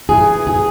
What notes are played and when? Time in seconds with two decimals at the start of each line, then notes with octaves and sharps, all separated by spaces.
0.09 E3 G#4
0.47 G#4